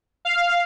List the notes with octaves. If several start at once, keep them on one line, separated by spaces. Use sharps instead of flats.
F5